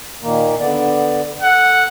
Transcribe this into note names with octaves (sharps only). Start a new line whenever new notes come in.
A#2 D#3 A#3
D3 B3 D5
A4 F#5